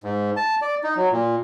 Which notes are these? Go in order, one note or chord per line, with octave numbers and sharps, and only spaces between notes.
G#2
A5
D5
D#4
F#3
A#2